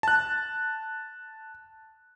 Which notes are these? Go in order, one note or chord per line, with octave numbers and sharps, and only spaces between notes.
A5 F#6